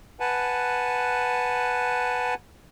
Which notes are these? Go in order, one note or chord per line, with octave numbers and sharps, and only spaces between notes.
B4 F#5 G#5 A5